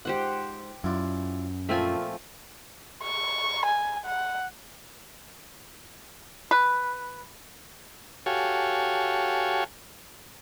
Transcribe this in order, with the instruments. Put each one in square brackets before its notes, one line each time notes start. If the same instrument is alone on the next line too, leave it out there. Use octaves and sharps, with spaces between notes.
[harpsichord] G#2 [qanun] G4 C5 F#5
[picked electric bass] F#2 [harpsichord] E4 F4 D5
[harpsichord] A#2 [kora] F3 C4 E5 [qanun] A3 F4 G#5
[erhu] C#6
G#5
F#5
[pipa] B4
[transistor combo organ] F#4 G4 A4 C#5 F5 G#5